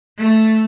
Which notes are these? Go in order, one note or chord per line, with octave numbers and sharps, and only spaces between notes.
A3